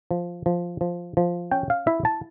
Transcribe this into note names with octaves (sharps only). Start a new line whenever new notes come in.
F3
F3
F3
F3
C#4 G5
F5
E4 E5
A5